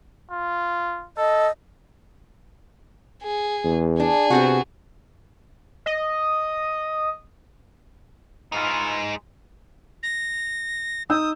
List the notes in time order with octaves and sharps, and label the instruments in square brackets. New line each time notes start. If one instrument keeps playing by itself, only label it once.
[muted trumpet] F4
[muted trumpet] A4 [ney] D#5
[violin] G#4
[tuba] E2
[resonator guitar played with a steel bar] D4 [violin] G#4
[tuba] C3 [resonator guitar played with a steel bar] B3 C4 F#4
[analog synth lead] D#5
[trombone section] B2 E3 F4 [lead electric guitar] G#3 D#4
[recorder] A#6
[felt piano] D#4 E6 G6 [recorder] D#6